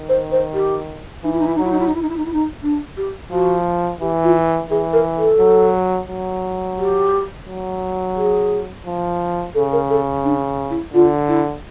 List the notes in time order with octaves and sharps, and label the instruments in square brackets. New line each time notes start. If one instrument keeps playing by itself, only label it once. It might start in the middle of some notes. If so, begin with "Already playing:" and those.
Already playing: [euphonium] D#3
[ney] C5
C5
G4
[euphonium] E3 [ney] D#4
[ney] E4
D#4
E4
D#4
[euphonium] F#3 [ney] E4
[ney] D#4
E4
D#4
E4
D#4
E4
D#4
E4
D#4
D4
G4
[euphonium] F3 [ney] F#4
[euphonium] E3 [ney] G4
[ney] F4
[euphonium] E3 [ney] G#4
[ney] A#4
A4
[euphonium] F#3
F#3
[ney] G4
[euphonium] F#3
[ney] G#4
[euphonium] F3
[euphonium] C#3 [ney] A4
[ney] A#4
A4
D4
E4
[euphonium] D3 [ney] F4
[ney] E4